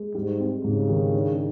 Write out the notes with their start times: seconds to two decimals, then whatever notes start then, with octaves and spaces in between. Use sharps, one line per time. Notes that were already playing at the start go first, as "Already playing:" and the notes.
Already playing: G#3
0.15 G#2 G3
0.40 C4
0.64 G#2 C#3
0.89 D#3
1.14 D4